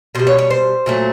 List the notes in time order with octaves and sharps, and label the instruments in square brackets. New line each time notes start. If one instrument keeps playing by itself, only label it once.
[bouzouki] B2 G3 C5
C#5
C#5
C5
A#2 F#3 A3